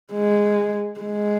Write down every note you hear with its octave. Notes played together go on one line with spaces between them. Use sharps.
G#3
G#3